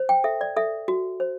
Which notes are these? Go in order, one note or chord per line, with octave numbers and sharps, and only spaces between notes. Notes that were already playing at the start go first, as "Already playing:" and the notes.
Already playing: C5
G5
A4 E5
D5
A4 E5
F#4
C5